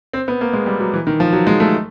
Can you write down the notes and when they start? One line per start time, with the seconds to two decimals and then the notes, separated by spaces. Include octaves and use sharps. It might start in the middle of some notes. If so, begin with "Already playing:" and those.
0.13 C4
0.28 B3
0.41 A#3
0.53 G#3
0.66 G3
0.80 F#3
0.94 E3
1.07 D#3
1.20 F3
1.33 F#3
1.47 G#3
1.60 A3